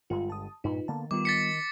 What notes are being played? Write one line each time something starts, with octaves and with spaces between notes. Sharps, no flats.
G1 G2 G#3 F4
A5 D#6
G2 A#2 D#4 F4 B4
D3 A#3 B3 A5
D#3 G3 B3 F4 D6
A6 B6 C#7